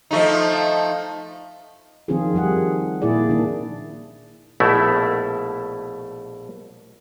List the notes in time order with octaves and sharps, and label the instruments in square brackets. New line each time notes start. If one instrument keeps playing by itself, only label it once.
[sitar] F3 A3 D#4
[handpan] D#3 F3 C4 D4 F4 G#4
F3 G3 G#4 F#5
A#2 A#3 E4 G#4 D5
D#3 D4
[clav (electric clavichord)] A#1 B2 A3 E4